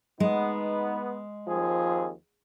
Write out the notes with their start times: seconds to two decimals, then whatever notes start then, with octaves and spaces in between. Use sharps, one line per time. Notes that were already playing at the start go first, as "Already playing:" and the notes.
0.20 G#3 B3 D#4
1.48 D#2 F3 C4 G#4